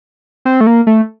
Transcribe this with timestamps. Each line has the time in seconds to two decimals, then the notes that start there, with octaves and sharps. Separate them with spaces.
0.45 C4
0.61 A3
0.67 A#3
0.87 A3